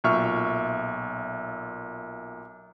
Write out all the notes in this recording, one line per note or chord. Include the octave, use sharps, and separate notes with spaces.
B1 A#2 E5 C#6 F6